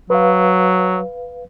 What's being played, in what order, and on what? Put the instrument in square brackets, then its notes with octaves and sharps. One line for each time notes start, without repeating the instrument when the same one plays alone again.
[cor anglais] F#3 [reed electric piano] B4 F5